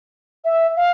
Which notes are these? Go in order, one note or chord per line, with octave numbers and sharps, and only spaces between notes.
E5
F5